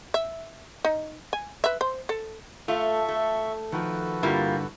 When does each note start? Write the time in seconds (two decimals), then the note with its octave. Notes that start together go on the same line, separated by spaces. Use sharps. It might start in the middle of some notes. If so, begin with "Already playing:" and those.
0.14 E5
0.85 D#4
1.33 G#5
1.64 B4 E5
1.81 C5
2.09 A4
2.68 A3 F4 E5 C#6
3.09 A3
3.72 D#3 F3 F#4 A4 B4
4.23 G2 D3 G3 A#3 E4 F4